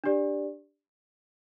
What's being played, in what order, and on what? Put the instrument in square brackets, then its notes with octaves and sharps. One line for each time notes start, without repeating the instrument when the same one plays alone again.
[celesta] D4 G4 D5